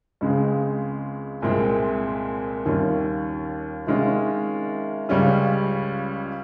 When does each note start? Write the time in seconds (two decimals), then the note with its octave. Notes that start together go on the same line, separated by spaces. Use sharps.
0.21 C#2 C#3 G#3 C4
1.42 C2 A#2 G#3 C4
2.65 D#2 D#3 G3 C#4 F4
3.86 C3 D#3 G#3 C#4 F4
5.09 C#2 C#3 G3 C#4 F4